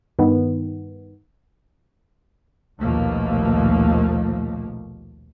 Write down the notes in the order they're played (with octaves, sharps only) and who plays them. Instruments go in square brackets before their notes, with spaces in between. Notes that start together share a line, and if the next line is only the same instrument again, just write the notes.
[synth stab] G2 D#3 B3
[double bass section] A#1 D#2 B2 F3 A3 A#3